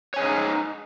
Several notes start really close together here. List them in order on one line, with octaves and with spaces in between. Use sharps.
C#5 G#5 G#4 D#5 D#4